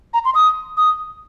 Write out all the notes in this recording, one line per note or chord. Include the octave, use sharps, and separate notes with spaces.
A#5
C6
D#6
D#6